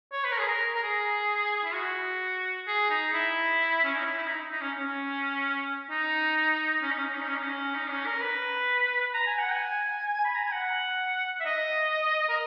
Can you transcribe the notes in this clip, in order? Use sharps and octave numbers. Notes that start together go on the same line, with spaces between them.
C#5
B4
A#4
G#4
A#4
A#4
G#4
E4
F#4
G#4
D#4
E4
C#4
D#4
E4
E4
D#4
D#4
C#4
C#4
D#4
C#4
D#4
C#4
D#4
C#4
D#4
C#4
D#4
C#4
D#4
C#4
A#4
B4
A#5
G#5
F#5
G#5
B5
A#5
G#5
F#5
E5
D#5
A#4